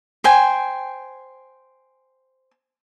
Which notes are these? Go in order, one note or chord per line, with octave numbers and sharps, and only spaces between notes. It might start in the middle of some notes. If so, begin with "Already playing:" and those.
C5 G5 G#5